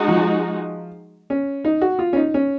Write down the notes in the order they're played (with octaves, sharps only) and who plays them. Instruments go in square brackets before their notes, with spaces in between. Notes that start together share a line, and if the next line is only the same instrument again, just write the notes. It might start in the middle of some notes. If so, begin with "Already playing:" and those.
Already playing: [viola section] G#3 D#4 F#4
[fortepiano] F3
C#4
D#4
F#4
F4
C#4
D#4
C#4